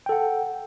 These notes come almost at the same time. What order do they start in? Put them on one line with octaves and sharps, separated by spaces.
G5 A4 F#5